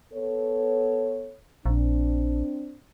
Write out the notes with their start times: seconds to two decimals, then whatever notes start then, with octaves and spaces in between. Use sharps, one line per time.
0.13 B3 A4 C#5
1.66 A#1 C4 D4